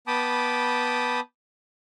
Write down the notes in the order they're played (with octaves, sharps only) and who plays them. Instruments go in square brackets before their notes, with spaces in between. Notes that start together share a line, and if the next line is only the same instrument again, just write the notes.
[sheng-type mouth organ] B3 G5 A5 B5 D6 D#6